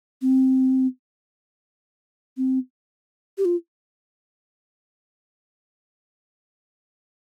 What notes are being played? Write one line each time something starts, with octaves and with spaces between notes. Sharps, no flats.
C4
C4
G4
F4